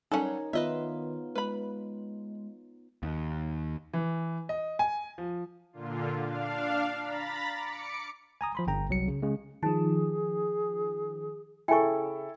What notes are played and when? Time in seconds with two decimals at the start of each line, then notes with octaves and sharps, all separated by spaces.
0.12 F#3 G3 C#4 D#4 A4 A#4 C#5 F#5
0.53 D#3 B3 F4 B4 D#5 E5
1.35 G#3 B4 B5
3.03 D#2
3.93 E3
4.49 D#5
4.79 G#5
5.18 F3
5.73 A#2 D3 F4
6.21 D4 F5
6.99 A#5 B5 A6 B6
7.56 D6 C#7
8.41 G#5 A#5 D#6
8.55 F3 B5 C6
8.67 G1 G5 A#5
8.89 C2 F#3 C#7
9.08 C#3
9.22 C#3 G#3
9.63 D#3 F3 D#4 G#4
11.68 C#3 E4 A4 G5 G#5 C#6